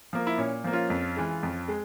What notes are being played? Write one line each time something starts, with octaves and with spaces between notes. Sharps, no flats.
F3 A#3
E4
A#2 C#4
F3 A#3
C#4 F4
F2
E3 G#3
F2
G#3